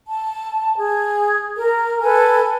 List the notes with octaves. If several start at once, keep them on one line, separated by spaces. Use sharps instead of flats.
A5
G#4
A#4
A4 B4 G#5